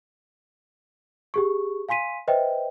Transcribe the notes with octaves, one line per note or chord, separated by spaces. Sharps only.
G4 G#4 C#6
F5 G#5 C6 B6 D#7
B4 C5 D#5 E5 G5